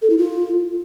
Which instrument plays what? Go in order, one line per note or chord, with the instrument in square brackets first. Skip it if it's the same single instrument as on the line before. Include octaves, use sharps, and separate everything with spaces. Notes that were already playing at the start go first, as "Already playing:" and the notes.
[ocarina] A4
E4
F4